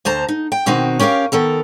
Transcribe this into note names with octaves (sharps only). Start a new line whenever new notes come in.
D2 C5 A5 A#5
D#4
G5
B2 D#3 C4 D#4 F#4
C#4 G4 A#4 C5 F5
D#3 B3 A4 A#4